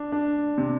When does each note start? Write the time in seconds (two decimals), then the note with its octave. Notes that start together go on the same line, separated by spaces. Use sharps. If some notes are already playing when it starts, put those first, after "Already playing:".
Already playing: D4
0.12 D4
0.58 C3